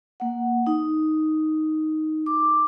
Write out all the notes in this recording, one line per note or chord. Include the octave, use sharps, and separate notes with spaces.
A#3 F#5
D#4
D6